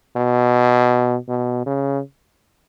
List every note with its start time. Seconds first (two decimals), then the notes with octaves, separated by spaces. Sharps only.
0.16 B2
1.29 B2
1.66 C#3